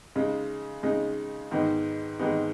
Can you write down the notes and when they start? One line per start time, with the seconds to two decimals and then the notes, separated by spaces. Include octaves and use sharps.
0.15 C#3 G#3 D#4
0.83 C#3 G#3 D#4
1.51 G#2 D#3 G#3 B3 D#4
2.19 G#2 D#3 G#3 B3 D#4